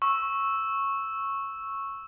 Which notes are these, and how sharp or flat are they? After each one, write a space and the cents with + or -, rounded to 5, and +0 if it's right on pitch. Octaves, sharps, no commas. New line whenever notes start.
C#6 -10 E6 +0